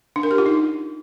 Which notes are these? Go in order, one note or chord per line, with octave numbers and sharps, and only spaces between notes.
D4
A#4
G4
F4
D#4